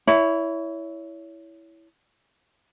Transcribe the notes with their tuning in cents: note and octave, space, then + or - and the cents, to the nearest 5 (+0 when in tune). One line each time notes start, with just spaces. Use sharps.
E4 +0 C#5 +25